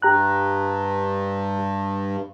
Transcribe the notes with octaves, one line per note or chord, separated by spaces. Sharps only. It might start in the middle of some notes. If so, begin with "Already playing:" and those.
G2 G4 A#5 F#6